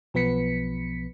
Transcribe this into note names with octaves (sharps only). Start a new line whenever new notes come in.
B1 F3 B3 B4 B6 C#7